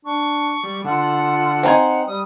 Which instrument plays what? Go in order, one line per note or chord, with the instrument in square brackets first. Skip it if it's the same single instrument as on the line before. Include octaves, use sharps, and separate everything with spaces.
[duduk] D4 [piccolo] C#6
[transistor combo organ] G3
[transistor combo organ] D3 [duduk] F4 [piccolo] F#5
[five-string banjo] C4 D#4 G#5
[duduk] G3 [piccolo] D#6